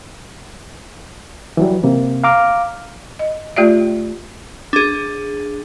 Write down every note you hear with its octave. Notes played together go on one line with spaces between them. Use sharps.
E3 F#3 G3
C3 A#3
F5 A#5 D6 F6
D#5
A3 F4 G4 D5 E5
D4 G#4